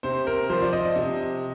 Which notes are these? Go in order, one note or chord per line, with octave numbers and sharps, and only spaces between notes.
C3 C5
A#4
F3 C5
D5
D#5
C3